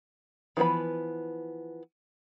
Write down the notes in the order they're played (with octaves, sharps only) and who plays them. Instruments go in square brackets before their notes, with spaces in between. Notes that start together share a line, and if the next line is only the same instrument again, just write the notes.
[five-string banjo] E3 F3 B3 B4 B5